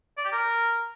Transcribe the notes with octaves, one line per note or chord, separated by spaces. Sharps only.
D5
G4
A#4